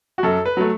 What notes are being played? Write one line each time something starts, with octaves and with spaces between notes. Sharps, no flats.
F#4
F#2 A4
B4
F#3 A3